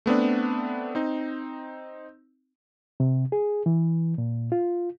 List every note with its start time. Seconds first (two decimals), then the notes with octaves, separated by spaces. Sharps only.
0.06 A3 B3 C4 D4
0.95 C4 D#4
3.00 C3
3.32 G#4
3.66 E3
4.18 A#2
4.52 F4